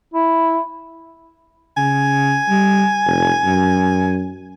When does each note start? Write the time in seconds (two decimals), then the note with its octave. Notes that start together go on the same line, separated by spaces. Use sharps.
0.14 E4
1.77 C#3 G#5
2.49 G3
3.06 F1
3.44 F#2